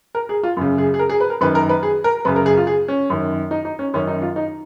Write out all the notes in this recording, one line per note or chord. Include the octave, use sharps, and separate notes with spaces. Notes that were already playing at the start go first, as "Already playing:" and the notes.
A#4
G#4
F4
F#2 C#3
G#4
G#4
A#4
G#4
B4
A#4
F#2 D#3 B4
A#4
B4
G#4
A#4
F#2 C#3 B4
A#4
G#4
F4
G#4
C#4
F#2 D#3
D#4
D#4
C#4
F#2 D#3 C#4
D#4
F4
D#4